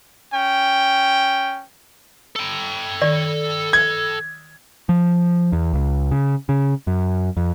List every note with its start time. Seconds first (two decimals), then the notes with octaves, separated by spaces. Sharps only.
0.34 C#4 G5
2.36 A4 G5
3.02 D#3 D5
3.73 G#6
4.89 F3
5.52 E2
5.73 C#2
6.11 C#3
6.49 C#3
6.87 F#2
7.37 F2